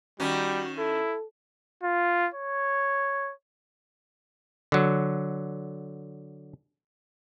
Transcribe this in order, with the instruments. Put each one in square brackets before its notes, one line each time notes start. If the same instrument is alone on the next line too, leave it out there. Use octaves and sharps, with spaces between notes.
[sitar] D#3 C#4 [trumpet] G3 [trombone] F#4
[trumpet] E4 [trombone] A4
[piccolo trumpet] F4
C#5
[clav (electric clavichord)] D3 F#3